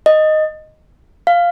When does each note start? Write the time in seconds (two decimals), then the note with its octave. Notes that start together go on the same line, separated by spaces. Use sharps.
0.06 D#5
1.27 F5